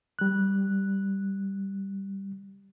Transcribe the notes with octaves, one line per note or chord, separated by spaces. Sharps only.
G3 F#6